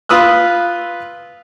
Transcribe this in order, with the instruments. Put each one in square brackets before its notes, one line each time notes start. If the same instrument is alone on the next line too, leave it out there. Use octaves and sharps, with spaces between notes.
[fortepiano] F4 B4 D#6 E6 F#6